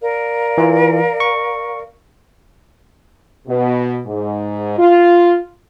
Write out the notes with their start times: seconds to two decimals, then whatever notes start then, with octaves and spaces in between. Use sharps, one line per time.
0.02 A#4 D5 F5
0.58 E3 F4
1.20 C#6
3.48 B2
4.06 G#2
4.78 F4